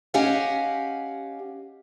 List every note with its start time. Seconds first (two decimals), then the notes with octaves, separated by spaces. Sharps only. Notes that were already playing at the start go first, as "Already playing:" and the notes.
0.14 C#4 G4 D#5 F5 F#5 G#5